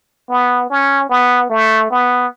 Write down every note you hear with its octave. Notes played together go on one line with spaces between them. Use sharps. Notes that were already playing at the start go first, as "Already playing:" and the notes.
B3
C#4
B3
A3
B3